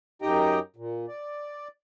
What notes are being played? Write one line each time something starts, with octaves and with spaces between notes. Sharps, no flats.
F#2 D#4 G4 D#5 G5 A#5
A#2
D5